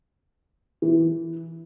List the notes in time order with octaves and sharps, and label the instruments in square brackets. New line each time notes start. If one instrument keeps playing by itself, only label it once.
[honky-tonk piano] E3